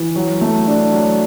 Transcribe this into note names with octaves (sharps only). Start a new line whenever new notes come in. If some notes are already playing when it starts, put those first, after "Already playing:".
Already playing: E3
F#3
A3
D4
F#3